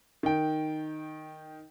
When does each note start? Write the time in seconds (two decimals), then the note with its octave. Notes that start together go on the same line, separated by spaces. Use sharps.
0.23 D#3 G5